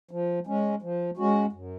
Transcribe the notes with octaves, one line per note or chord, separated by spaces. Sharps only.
F3
G#3 C#4
F3
G#3 C#4 F#4
F#2